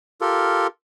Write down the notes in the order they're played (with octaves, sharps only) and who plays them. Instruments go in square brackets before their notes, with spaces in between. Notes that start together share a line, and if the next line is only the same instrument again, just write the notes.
[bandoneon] F4 G4 A4 A#4